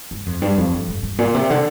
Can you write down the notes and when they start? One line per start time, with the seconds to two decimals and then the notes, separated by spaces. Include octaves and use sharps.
0.11 G2
0.26 F2
0.42 G2
0.57 F2
0.73 G2
0.88 G2
1.03 G2
1.19 A#2
1.35 C3
1.50 D3